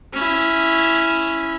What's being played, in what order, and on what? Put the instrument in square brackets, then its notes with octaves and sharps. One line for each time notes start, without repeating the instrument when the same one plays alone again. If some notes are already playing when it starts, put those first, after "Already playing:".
[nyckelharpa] C#4 E4